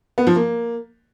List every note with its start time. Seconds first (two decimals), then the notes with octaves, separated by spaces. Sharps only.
0.18 B3
0.27 F3
0.36 A#3